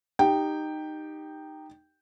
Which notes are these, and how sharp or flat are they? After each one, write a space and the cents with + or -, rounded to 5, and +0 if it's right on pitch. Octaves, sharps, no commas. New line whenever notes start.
D#4 -15 G4 +0 G5 +0